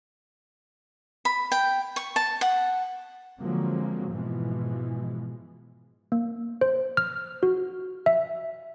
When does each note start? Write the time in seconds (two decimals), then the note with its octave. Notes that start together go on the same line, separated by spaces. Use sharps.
1.25 B5
1.52 G5
1.96 C#6
2.16 A5
2.41 F#5
3.40 D3 F3 F#3 G#3 A#3 C4
4.11 G#2 B2 E3 F3 G#3
6.12 A#3
6.61 C5
6.97 F6
7.43 F#4
8.06 E5